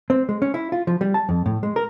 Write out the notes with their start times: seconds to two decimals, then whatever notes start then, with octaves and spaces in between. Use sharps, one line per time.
0.10 C4
0.29 G#3
0.42 C#4
0.54 E4
0.72 F4
0.87 F3
1.01 G3
1.14 A5
1.29 F2
1.46 A2
1.63 G#3
1.76 A#4